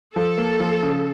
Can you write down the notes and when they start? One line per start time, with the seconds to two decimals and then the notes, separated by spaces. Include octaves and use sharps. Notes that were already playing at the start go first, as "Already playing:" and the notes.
0.16 F3 A4
0.38 A#3
0.60 F3
0.83 C#3